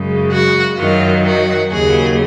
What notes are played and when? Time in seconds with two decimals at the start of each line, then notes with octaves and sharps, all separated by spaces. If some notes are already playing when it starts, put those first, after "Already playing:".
Already playing: F#2 C#3 G#3
0.32 F#4
0.78 F#2 D#3 F#3 F4
1.26 F#4
1.72 D#2 C#3 F#3 G#4